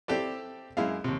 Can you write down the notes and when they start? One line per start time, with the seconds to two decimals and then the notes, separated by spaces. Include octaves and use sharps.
0.08 C4 E4 G4 A4 D5
0.77 F#2 G#3 E4 F5
1.04 D#2 C3